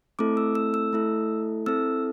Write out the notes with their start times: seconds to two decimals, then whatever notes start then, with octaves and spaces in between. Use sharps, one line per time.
0.19 A3 C4 E4 A4 D6
0.37 E6
0.55 E6
0.74 E6
0.93 A3 E4 A4
1.66 C4 E4 A4 E6